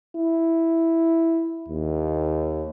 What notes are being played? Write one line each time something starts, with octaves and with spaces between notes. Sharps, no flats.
E4
D#2